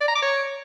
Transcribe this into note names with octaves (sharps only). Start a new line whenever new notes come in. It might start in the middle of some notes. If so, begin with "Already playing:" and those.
D5
A#5
D6
C#5